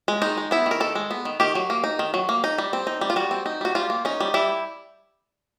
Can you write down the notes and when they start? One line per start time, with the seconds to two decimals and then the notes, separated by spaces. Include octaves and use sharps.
0.08 G#3
0.22 D#3 D#4
0.37 G#3
0.51 B3 E4
0.66 D#3
0.71 A#4
0.80 D#3 A4
0.95 G#3
1.11 B3
1.25 D#3
1.40 D#3 G4
1.55 F#3
1.70 A#3
1.84 D#4
1.99 D#3
2.14 F#3
2.29 A#3
2.44 D#4
2.58 G3
2.73 C4
2.87 D#4
3.01 G3
3.10 F4
3.16 G3 F#4
3.31 C4
3.46 D#4
3.61 G3 F#4
3.75 G3 F4
3.90 A#3
4.05 C#4 D#4
4.20 G3
4.34 G3 E4